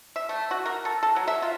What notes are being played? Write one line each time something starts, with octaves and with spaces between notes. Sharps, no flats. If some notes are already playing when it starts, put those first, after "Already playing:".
E5
A3
F#4
A#4
A4
A4
F#3
E5
F4